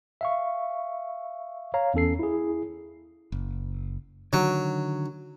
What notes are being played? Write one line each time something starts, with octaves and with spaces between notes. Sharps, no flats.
E5 F5 C#6
C#5 F5 A#5
E2 C#4 A4 C7
E4 G#4
F#1
D3 D#3 F#3